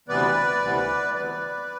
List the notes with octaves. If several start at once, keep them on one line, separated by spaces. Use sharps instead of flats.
D2 C3 E3 G3 B3 B4 D5
D2 C3 E3 G3 B3
D2 C3 E3 G3 B3 B4 D5